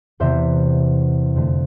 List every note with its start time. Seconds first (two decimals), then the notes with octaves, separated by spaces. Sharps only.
0.20 E2 C3 E3 B3 C5 E5
1.35 F2 D3 A3